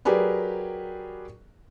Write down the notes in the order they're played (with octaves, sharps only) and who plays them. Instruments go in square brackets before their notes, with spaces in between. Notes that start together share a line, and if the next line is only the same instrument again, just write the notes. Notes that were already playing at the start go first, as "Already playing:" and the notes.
[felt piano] F#3 G4 G#4 A#4 B4 D5